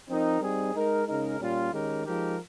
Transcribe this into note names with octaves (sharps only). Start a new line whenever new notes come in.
F3 C4 D#4 A#4
G3 C4 D#4 G#4
G#3 D#4 A#4
C#3 G#3 D#4 A#4
A#2 G3 C#4 F4
D#3 G#3 C#4 G4 A#4
F3 G#3 D#4 G4 A#4